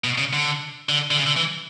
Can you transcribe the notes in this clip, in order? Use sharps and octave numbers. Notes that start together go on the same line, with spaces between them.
B2
C#3
D3
D3
D3
C#3
D3
E3